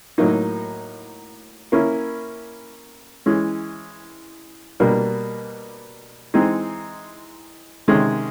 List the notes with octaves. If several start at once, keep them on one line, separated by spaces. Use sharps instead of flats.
A2 F#3 A#3 D#4
A#3 C#4 E4
E3 G#3 C#4
B2 G3 A#3 D4
E3 G#3 C4 D#4
C3 D#3 G#3 C#4